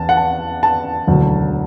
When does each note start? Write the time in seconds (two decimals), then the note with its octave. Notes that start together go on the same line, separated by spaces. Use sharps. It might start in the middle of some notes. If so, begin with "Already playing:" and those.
Already playing: E2 A5
0.09 F#5
0.17 A5
0.63 A5
1.07 E1 D2 D3 F#3